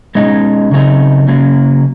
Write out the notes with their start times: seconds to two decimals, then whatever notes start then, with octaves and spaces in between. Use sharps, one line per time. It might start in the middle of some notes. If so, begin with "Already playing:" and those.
0.15 B2 G#3 C#4 D#4
0.71 C#3 F#3 A3 C4 D#4
1.28 C#3 F#3 A#3 C#4